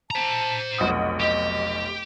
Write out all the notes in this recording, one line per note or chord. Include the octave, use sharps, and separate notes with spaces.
C5 A5 A#5
F1 B1 F#5 D#6
G4 D#5